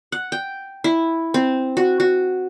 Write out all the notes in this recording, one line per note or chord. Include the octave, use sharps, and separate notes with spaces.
F#5
G5
E4
C4
F#4
F#4